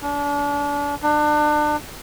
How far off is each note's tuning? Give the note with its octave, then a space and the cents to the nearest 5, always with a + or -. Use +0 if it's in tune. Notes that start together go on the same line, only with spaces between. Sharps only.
D4 -35
D4 +30